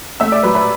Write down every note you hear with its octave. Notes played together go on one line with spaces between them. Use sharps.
A3 E5 E6
D5 D6
F#3 B4 B5
B4 B5